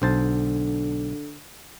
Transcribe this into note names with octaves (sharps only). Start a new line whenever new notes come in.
B1 D3 C5 A5